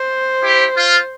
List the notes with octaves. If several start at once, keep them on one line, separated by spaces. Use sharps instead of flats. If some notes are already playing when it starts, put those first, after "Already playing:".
Already playing: C5
E4 G4
F4